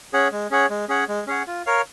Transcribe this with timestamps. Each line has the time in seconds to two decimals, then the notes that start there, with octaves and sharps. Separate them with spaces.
0.13 C#4 G#4 C#5 F#5
0.32 G#3
0.51 C#4 G#4 C#5 F#5
0.70 G#3
0.89 C#4 G#4 C#5 F#5
1.09 G#3
1.27 C#4 G#4 C#5 F#5
1.47 F4
1.66 A#4 C#5 F5